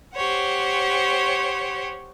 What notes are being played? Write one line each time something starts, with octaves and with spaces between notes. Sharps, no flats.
G4 C5 C#5 F#5